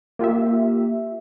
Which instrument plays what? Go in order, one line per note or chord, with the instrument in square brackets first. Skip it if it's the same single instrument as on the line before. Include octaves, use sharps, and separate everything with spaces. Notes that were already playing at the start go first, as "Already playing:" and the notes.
[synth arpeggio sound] A#3 F4 G4 E5